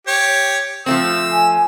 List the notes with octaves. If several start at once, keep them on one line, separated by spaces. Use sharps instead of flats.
G4 C#5
F3 A3 C4 E6
G#5